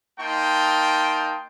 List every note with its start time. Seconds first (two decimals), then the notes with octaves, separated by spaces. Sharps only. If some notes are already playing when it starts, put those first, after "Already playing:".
0.19 A#3 D#4 G5 A5 C6